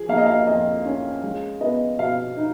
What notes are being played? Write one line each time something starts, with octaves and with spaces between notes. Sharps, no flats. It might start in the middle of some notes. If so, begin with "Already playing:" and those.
Already playing: F3 G#4
A#3 F5
D#5
F5
F2 D#5
C#4
G#3
B3 D#5
B2 F5
D#4